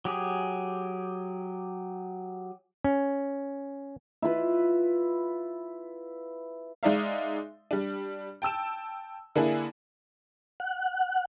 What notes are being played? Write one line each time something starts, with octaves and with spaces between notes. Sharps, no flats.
F#3 G4 G#4
C#4
E4 F4 B4
G#3 D#4 D5 E5 F5
G3 D4
G5 A5 E6 E7
D3 A#3 D4 E4 G#4
F#5